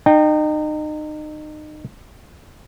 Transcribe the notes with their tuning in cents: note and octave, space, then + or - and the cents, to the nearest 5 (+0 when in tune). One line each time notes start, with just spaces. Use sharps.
D#4 -30 G5 +0